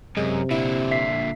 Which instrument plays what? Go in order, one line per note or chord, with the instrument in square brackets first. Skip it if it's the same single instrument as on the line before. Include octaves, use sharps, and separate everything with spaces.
[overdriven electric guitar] F#2 [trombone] C3 [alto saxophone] G#3
[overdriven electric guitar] A#2 D3 [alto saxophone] E4
[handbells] E5 B6 C7